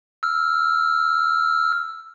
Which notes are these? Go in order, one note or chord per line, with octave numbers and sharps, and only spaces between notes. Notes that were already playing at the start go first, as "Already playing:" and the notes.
E6 F6